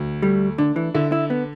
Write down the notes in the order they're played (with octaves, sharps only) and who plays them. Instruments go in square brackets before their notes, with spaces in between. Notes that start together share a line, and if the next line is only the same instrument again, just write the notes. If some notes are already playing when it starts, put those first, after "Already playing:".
Already playing: [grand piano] D2
[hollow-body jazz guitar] G3 [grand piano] A3
[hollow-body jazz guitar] D3 [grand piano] D4
[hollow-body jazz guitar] E3
[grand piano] D3 [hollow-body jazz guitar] E4
[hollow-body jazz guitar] E4
B3